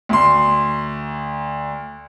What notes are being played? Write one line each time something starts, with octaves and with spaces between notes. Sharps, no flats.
D2 C6